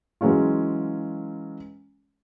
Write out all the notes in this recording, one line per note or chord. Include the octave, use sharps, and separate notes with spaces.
E3 F#3 G#3 C#4 F4